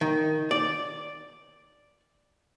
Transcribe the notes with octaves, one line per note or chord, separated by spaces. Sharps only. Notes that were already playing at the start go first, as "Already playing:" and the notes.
D#3
D5